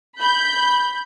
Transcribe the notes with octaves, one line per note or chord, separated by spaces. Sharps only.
B5 G6